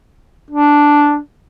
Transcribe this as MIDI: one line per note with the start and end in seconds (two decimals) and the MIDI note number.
0.50 1.19 62